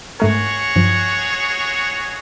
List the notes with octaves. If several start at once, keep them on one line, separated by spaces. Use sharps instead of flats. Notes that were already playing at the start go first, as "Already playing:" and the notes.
G#2 A3 F#4 G#4 A#4 C#5
G2 F3